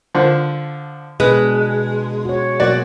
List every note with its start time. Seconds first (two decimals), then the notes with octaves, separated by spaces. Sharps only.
0.15 D3 F3
1.20 B2 G#3 D4 B4
2.25 F#4 C#5
2.60 B2 F#3 A#3 F#4 D5